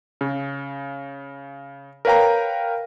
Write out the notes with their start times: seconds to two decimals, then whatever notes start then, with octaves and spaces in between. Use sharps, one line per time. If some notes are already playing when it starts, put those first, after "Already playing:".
0.21 C#3
2.05 A#4 B4 C#5 F5 G5 A#5